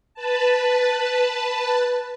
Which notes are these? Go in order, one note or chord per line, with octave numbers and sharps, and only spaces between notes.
B4 A5